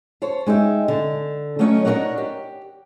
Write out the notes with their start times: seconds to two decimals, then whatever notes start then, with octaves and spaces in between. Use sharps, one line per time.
0.22 C5 C#5 A5
0.46 G#3 D#4 G4 E5
0.88 D3
1.59 F#3 A3 C#4 F4 C#5 D#5
1.85 D4 D#4 G#4 A#4 C#5 F#5
2.18 G4